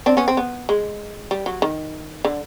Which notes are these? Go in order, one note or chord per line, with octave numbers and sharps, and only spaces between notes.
C4 D4
B3 C#4
C4
B3
G#3
G3
F#3
D#3
D3